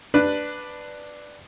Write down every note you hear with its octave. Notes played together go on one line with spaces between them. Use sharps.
D4 B4 F#6